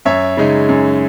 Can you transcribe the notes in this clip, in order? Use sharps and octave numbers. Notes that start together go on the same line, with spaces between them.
F#2 C#5 E5
C#3 G#3 D#4
F#2